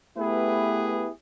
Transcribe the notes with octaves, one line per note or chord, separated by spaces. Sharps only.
A3 B3 E4 G4 G#4 B4